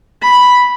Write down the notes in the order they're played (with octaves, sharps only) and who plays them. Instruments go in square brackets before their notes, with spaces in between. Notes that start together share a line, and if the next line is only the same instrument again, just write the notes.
[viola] B5